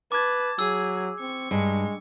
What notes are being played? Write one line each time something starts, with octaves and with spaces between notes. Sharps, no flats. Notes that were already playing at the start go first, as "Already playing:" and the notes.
B4 A5 D6 G#6
F#3 G#4 E6
C4 C#6
G2 G#3